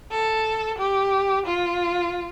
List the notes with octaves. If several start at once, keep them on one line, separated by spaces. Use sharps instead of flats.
A4
G4
F4